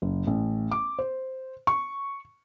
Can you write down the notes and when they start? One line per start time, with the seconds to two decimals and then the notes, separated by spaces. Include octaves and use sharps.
0.02 F#1
0.27 A1
0.71 D6
0.99 C5
1.67 C#6